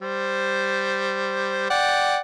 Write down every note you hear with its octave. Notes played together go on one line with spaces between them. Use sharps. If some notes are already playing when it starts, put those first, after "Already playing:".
G3 C5
D5 F#5 G5